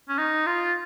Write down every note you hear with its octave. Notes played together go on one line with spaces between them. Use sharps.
C#4
D#4
F4